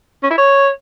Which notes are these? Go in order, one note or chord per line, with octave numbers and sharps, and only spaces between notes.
C#4
E4
C#5